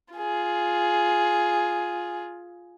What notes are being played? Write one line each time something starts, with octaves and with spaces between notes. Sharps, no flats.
F4 G#4